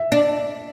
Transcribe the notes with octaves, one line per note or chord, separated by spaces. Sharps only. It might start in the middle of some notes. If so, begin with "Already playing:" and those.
Already playing: E5
D4